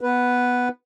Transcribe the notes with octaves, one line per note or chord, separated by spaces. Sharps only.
B3 B4